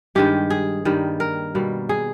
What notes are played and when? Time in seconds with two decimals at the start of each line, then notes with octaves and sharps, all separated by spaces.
0.15 G2 D#3 G#3 G4
0.50 G#4
0.85 G2 D#3 G3 A#3
1.20 A#4
1.55 B2 G3 A#3
1.89 G#4